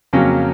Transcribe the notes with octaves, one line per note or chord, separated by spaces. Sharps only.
F2 C#3 F#3 A#3 C#4